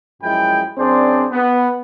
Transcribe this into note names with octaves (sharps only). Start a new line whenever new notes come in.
F#2 F3 G#3 E4 G5 B5
F#2 C4 D4 G#4 C5 D5
B3